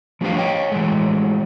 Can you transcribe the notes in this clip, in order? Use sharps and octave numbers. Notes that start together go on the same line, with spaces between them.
F3 A3 D4 G4 B4 F5
C#5 D#5 G5
E3 G#3 A3